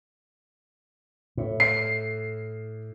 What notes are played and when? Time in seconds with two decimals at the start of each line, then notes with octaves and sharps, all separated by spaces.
1.37 A2
1.60 C7